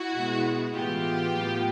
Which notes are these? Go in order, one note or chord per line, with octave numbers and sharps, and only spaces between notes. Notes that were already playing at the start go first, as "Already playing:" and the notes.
Already playing: E4 F#4
B2 G#3 B3
A2 E3 G#3 B3 F4 G4
A2 F#3 B3